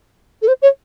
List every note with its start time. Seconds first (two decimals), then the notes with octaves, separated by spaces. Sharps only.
0.42 A4
0.48 C5
0.62 C#5